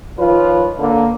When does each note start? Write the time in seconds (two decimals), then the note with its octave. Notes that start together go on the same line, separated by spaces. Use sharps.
0.17 D#3 F3 F4 B4 C#5
0.78 D3 A#3